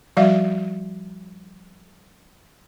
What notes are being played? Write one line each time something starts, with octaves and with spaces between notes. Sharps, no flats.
F3 G3 F#4 D5 E5 F5